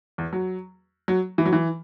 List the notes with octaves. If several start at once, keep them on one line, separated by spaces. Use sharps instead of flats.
E2
F#3
F#3
E3
F#3
E3